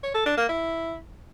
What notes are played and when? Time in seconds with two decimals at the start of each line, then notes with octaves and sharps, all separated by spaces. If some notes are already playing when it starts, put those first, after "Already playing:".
0.03 C#5
0.14 A4
0.26 D4
0.37 A#3
0.49 E4